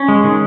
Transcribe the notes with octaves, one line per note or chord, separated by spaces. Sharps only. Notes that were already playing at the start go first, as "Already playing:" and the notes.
Already playing: C#4
G#3
D#3